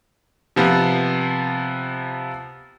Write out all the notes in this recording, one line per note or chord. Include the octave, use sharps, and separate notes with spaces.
C3 F3 B3